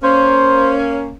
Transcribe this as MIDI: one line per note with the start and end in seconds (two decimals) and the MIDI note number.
0.03 1.15 58
0.03 1.15 61
0.03 0.74 72